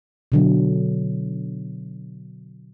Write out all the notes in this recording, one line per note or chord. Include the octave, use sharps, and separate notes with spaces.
B2 D3 F#3